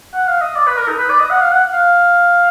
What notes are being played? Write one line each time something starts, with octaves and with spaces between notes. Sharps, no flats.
F#5
F5
D#5
D5
B4
A#4
D#4
B4
D5
D#5
F#5
F5
F#5
F5